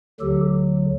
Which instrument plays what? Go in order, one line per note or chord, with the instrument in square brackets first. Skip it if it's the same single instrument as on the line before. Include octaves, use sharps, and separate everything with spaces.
[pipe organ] D2 D3 F#3 G4 A4